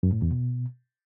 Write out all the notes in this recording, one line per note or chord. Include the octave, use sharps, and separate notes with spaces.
F#2
A2
E2
B2